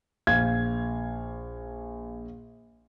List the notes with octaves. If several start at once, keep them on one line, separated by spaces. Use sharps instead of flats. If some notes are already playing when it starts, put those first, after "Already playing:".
A#1 F5 G#6